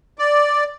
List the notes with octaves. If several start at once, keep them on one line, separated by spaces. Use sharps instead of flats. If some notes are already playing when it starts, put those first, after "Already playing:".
D5